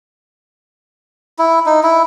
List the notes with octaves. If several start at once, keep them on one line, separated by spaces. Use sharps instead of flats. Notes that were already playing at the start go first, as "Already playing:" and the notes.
E4
D#4
E4